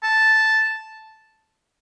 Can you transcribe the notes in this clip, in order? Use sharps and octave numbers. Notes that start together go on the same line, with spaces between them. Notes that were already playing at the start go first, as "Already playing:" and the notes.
A5